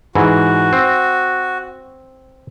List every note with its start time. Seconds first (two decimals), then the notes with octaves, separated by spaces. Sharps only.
0.15 G#2 E3 F#4
0.73 C4